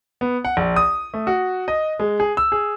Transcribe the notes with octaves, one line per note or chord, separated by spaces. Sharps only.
B3
F#5
A#1
D#6
A3
F#4
D#5
G#3
G#4
E6
G#4